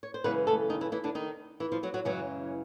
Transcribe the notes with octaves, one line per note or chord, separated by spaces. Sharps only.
C#5
C5
F#2 C#3 E3 G#3 B3 B4
A3 A4
D#3 D#4
E3 E4
E3 E4
D3 D4
D#3 D#4
E3 E4
F3 F4
F#3 F#4
F#3 F#4
F#2 C#3 E3 F#3 G#3 F#4